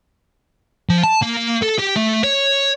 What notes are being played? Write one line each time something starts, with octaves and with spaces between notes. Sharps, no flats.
F3
A5
A#3
A4
G4
A3
C#5